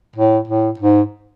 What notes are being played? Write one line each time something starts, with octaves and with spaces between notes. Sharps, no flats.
A2
A2
G#2